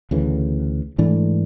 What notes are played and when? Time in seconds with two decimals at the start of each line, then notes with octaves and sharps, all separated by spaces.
0.11 D2 C#3 E3
0.98 G#2 E3 A3 D4